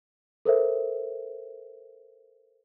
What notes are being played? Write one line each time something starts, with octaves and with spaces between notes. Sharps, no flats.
A4 A#4 C5 E5